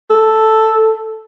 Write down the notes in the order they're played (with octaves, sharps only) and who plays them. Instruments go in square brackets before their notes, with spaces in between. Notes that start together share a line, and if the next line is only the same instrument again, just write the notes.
[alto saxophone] A4